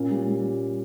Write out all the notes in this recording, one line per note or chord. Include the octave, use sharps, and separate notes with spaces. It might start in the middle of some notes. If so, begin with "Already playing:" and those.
Already playing: A#2 C#4
G3
G3